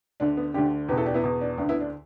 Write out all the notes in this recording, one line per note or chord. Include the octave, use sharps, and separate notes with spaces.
D2 D3 D4
B3
D2 D3 D4 G4
E2 B2 G4 B4
E4 A4
D4 G4
B3 E4
E2 B2
D4
D2 D3 D4
B3 E4
D4